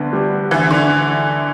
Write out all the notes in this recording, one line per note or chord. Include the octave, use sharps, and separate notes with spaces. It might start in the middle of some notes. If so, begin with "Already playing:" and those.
Already playing: D2 D3 B3
G3
D2 E3
D3